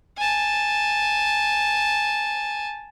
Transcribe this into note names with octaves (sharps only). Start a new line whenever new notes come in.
G#5 A5